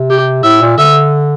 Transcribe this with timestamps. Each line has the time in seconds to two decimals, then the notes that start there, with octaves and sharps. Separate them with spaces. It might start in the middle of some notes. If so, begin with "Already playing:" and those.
Already playing: C3
0.10 G4
0.44 A2 E5
0.62 A#2
0.78 D3 E5